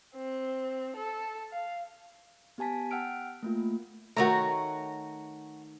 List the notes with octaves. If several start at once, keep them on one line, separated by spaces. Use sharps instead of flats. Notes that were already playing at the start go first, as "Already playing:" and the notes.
C4
A4
F5
B3 G4 G#5 A5 B6
F#5 G5 E6 F6 D7
A3 A#3 F4
D#3 A3 F#4 C#5 A#5